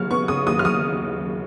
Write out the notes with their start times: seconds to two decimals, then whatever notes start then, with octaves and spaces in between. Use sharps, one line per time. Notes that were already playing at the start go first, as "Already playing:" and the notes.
Already playing: D#2 C#3 F#3 B3 F6
0.11 B3 C#6
0.28 C#3 D#6
0.47 D#2 D#6
0.59 F6
0.65 F#3 D#6